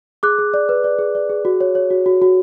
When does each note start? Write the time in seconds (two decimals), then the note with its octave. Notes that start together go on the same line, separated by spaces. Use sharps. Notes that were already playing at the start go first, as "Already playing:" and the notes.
0.23 G#4 D6 F#6
0.39 G#4
0.54 D5
0.69 B4
0.84 D5
0.99 G#4
1.15 D5
1.30 G#4
1.45 F#4
1.61 C#5
1.75 C#5
1.90 F#4
2.06 F#4
2.22 F#4